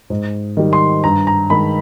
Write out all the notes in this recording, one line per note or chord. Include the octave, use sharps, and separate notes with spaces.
G#2
D#3 G3
C6
G2 A#5
A#5
D#3 G#3 B5